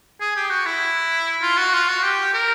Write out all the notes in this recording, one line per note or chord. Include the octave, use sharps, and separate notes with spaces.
G#4
G4
F#4
E4
F4
F#4
F4
F#4
G4
A#4